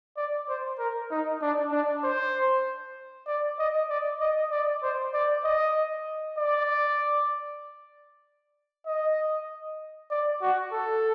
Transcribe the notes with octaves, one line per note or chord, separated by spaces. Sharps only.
D5
C5
A#4
D#4
D4
D4
C5
D5
D#5
D5
D#5
D5
C5
D5
D#5
D5
D#5
D5
F#4
A4